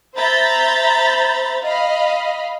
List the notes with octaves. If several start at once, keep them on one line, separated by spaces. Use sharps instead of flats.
C5 E5 A#5 B5 G6 A6
D#5 F5 B5